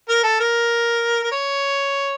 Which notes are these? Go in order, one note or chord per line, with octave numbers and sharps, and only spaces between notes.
A#4
A4
A#4
A#4
C#5